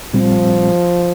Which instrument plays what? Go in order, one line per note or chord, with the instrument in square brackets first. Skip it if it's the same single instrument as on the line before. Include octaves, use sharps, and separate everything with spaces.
[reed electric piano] A#2 G3 C4 [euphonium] F3